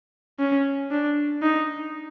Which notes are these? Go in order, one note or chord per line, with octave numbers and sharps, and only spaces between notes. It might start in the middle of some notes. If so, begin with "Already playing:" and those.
C#4
D4
D#4